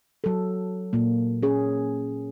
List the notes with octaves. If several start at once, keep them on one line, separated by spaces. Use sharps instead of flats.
F#3 A4
A#2 A#3
C#4 G#4